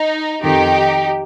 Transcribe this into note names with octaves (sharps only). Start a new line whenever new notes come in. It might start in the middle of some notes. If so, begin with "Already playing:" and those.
Already playing: D#4
F2 D#3 D#4 G4